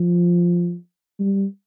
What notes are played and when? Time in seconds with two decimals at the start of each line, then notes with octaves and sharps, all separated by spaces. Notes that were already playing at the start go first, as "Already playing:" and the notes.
Already playing: F3
1.20 G3